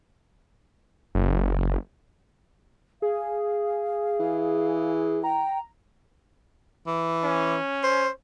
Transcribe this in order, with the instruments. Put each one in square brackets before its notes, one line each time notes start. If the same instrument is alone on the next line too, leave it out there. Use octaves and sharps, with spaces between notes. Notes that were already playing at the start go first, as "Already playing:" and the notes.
[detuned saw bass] F#1
[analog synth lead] G#4 [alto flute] F5
[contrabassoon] E3
[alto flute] G5 [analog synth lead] A#5
[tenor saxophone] E3
[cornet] C#4
[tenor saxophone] C5